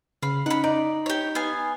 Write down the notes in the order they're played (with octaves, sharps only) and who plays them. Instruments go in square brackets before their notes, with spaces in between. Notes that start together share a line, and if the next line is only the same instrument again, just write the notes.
[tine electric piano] C#3 [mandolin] F5 B5
[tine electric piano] C#4 D#4 [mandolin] F#5 B5
[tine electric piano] D#4 [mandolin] D5
[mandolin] G4 C#5
B3 F5 G#5